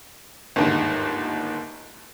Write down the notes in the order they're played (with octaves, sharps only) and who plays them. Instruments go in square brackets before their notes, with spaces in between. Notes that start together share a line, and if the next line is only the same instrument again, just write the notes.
[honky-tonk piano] G1 D#2 G#2